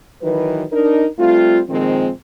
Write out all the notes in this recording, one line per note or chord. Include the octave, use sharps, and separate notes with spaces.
D#3 E3 F#3 B4
D4 D#4 A#4
G3 A3 C4 F4
A#2 D#3 F3 G#3 C4